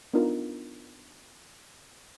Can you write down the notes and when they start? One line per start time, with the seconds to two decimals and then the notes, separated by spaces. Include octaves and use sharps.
0.14 B3 D4 D#4 F4 A#4